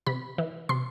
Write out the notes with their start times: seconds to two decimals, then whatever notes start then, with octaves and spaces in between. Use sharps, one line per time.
0.06 C3 B5
0.38 E3
0.69 C3 C6